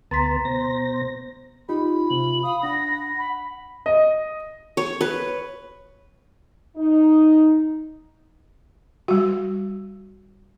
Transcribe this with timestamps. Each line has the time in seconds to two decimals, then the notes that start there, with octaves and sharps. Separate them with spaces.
0.11 D2 B3 A5 A#5 C6 B6
0.45 B2 C5 A#6
1.69 D#4 F4 G4 B5
2.10 C3 F#7
2.43 F5 D#6
2.63 D4 F#5 A#6
3.18 B5
3.86 D#5
4.77 C#5
5.01 B4
6.77 D#4
9.08 G3 F#4